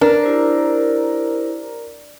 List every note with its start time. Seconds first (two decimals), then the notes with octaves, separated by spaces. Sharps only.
0.01 D4 A#4
0.22 E4 G4 C5